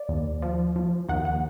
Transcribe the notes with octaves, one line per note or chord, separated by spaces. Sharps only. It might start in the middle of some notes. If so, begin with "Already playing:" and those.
Already playing: D5
D#2
F3
F3
D#2 F#5
F#5